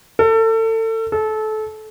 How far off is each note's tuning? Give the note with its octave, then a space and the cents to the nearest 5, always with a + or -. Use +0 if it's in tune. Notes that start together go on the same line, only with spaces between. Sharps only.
A4 +30
A4 -25